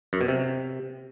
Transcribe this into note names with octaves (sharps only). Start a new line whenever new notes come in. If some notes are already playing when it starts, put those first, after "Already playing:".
F#2
B2
C3